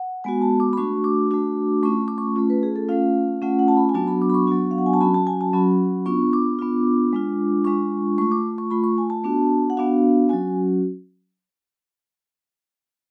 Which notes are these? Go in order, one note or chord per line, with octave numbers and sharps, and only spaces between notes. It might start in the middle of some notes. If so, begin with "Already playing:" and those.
Already playing: F#5
G#3 B3 F#4 G#5
A5
D6
B5
A3 D4 F#4 C#6
D6
A3 D4 F#4 D6
A3 C#4 F4 C#6
D6
C#6
A3 C#4 F4
B4
G#4
A4
A3 C#4 F4 F5
A3 C#4 F4 F#5
F#5
A5
B5
G#5
F#3 B3 D4 F#4 A5
B5
D6
B5
C#6
F#3 B3 D4 F#4
F5
F#5
G#5
A5
F#3 C#4 F#4 B5
A5
G#5
A5
F#3 C#4 F#4 B5
B3 D4 F4 C#6
D6
B3 D4 F4
G#3 D4 F4
G#3 D4 F4 C#6
A3 F4 C#6
D6
C#6
A3 F4 B5
C#6
G#5
A5
B3 D4 F#4
F#5
B3 D4 F#4 F5
F#3 C#4 F#4 G#5